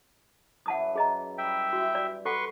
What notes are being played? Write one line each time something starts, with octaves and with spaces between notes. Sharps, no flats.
F#2 E3 E5 F#5 A5 D#6
G#4 D#5 A#5
G3 E5 G5
E3 F#4
D5
A4 B4 F#5 C6 C#6